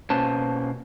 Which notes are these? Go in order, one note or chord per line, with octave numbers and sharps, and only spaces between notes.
B2 A#3 C#4 B4 C5 A5